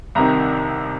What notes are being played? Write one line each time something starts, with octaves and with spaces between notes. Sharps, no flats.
C2 C3 D#3 A#5